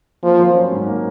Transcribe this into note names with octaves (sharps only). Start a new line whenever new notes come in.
F3 A#3
F#3
C#4
G#2
A#3